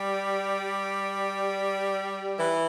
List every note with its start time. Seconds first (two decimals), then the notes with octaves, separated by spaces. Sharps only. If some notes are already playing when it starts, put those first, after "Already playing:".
Already playing: G3
2.38 E3